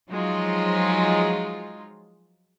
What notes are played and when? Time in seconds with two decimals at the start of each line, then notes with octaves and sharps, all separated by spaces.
0.10 F3 F#3 G#3 D#4 F4